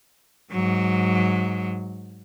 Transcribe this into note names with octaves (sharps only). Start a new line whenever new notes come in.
G#2 F#3